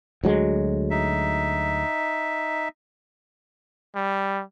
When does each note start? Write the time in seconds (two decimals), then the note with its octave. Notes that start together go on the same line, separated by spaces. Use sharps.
0.24 D2 F#3 G#3
0.91 D#4 E5
3.96 G3